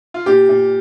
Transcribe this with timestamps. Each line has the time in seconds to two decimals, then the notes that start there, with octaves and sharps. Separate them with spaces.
0.14 F4
0.26 A#2 G4
0.49 A#2